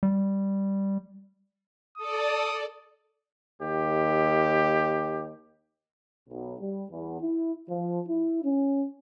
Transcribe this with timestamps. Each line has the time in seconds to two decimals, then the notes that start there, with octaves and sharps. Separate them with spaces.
0.03 G3
1.98 A4 D5 D#6
3.62 D#2 G4
6.29 B1
6.59 G3
6.91 E2
7.20 E4
7.69 F3
8.07 E4
8.43 C#4